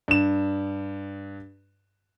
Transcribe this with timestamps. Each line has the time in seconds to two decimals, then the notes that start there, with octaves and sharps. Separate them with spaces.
0.08 G2 E7